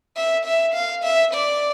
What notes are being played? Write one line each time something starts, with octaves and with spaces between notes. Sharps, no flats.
E5
E5
F5
E5
D5